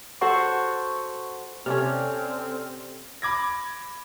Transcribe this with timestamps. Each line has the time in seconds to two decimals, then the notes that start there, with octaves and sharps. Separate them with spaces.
0.21 F#4 A4 C5 F#5 C#6
1.66 C3 C4 C#4 A4 D5 F6
3.22 B5 D6 G#6 A#6